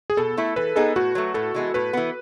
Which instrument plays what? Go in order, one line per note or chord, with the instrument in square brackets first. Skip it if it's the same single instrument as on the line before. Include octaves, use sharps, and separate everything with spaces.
[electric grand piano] G#4
[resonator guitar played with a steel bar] B2 [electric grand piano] A4
[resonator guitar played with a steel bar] A3 E4
[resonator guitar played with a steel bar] E3 [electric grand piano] B4
[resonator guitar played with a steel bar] B3 D#4 G#4 [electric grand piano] A4
[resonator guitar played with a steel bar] A2 [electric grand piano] F#4
[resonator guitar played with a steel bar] F#3 A3
[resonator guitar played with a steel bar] A2 [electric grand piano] A4
[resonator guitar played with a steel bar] E3 G#3 B3
[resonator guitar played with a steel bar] A2 [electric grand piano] B4
[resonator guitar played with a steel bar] E3 B3